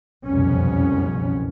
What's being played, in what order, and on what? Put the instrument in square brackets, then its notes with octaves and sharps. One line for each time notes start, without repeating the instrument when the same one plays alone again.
[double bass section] F#1 C2 F2 B2 C#4